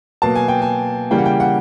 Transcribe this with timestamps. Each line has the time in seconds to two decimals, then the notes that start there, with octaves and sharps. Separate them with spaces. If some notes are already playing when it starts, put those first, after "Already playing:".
0.22 B2 F#3 A#3 A5
0.35 G#5
0.48 G5
0.62 G#5
1.11 C#3 E3 G3 A#3 G5
1.18 F#5
1.26 G5
1.40 F#5